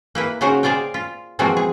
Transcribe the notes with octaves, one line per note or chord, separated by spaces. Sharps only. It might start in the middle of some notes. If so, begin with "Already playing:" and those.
A#3 E4 B4
C#3 D#4 F#4 G#4 A#4 C5
G#4 C5 D5 F5 G5
F4
E3 F3 G#3 A#3 C4 F#4
G#4